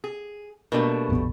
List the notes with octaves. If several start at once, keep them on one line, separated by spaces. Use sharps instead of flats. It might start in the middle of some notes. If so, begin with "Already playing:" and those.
G#4
B2 G3 A3 A#3 D4
F1 A#1 B3